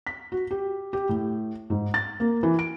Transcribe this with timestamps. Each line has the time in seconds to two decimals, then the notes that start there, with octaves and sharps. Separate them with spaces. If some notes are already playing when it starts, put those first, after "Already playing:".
0.07 B6
0.32 F#4
0.51 G4
0.93 G4
1.09 A2
1.70 G#2
1.94 A6
2.20 A#3
2.43 E3
2.59 D7